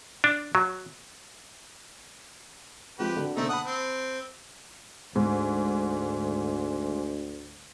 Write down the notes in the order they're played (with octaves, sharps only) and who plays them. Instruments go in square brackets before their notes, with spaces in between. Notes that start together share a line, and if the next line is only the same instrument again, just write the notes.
[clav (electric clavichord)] D4
F#3
[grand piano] F3 G#3 C4 [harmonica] G4 B4
[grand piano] D3 F#4
[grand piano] B2 D3 A#3 [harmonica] A3 C4 D#4
[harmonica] F#5 D#6 [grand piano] A5 B5
[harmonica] C4
[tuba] D2 [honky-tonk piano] G#2